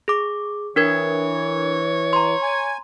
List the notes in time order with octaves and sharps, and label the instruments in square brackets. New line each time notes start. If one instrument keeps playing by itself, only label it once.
[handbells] G#4 D6
[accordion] E3 [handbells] D4 A#4 G#6 [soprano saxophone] C#5
[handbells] A#5 C6
[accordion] G#5